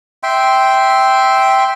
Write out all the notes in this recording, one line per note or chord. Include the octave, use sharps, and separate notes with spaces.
E5 G5 C6